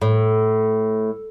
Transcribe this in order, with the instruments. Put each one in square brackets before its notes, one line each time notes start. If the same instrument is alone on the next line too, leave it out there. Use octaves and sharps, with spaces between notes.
[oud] A2